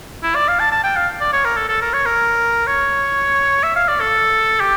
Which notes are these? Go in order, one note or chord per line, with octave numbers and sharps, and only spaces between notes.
E4
D5
F5
A5
A5
G5
F5
D5
C#5
A#4
A4
A4
A#4
C#5
A#4
C#5
E5
F5
D5
A4
G4